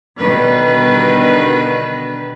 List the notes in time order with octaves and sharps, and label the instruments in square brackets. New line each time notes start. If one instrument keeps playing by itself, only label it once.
[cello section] B2 D3 D#3 G3 B4